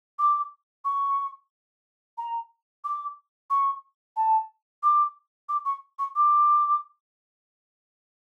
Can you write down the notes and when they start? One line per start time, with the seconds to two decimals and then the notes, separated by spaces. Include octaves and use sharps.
0.19 D6
0.85 C#6
2.18 A#5
2.84 D6
3.50 C#6
4.16 A5
4.83 D6
5.49 D6
5.65 C#6
5.99 C#6
6.15 D6